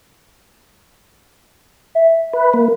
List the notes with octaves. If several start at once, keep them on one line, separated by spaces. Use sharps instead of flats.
E5
B4
A#3